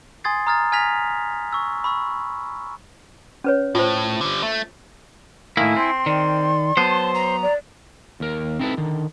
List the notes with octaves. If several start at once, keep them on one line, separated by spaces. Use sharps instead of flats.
G#5 C6 D#6 G#6 A6 C7
A#5 D#6 F6 G#6 A6
G#5 F6 G#6 A#6 B6 F7
C#6 E6
B5 C#6 E6
C#4 B4 C#5
A2 F4 C5
D3 G3
A3
A2 D#3 A#3 E4 G#5
C4 C6
D#3 D5
F#3 B3 C5 A5
A#5
D5
D#2 A#4
C4 D#4 E4 G#4 A4 B4
D3 D#3